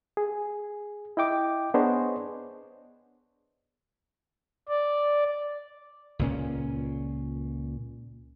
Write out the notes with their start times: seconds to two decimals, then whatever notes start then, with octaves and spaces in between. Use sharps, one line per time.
0.17 G#4
1.17 E4 D#5 G5 D6
1.74 B3 D4 G#4 C5 C#5 D#5
4.69 D5
6.19 C#2 A#2 C#4